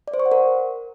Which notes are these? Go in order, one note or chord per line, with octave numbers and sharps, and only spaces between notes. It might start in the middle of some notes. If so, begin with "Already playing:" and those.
D5
C5
C#6
F#5
A#4